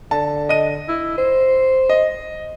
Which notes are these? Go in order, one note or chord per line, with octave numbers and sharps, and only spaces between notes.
D3 A5
D#5 D#7
E4
C5
D#5